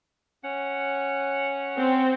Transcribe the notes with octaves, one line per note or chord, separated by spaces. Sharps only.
C#4 F#5
C4